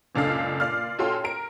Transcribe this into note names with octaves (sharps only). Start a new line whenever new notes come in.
F#1 C#2 D4 A4 F5
A#2 D5 F5 F6
C#4 F4 F#4 A4 G5 C6
A#4 D7